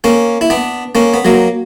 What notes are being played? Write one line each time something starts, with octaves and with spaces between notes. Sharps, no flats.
A#3 C#4
E4
B3 D4
A#3 C#4
B3
F#3 A#3